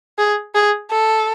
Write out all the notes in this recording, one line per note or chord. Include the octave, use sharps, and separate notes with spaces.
G#4
G#4
A4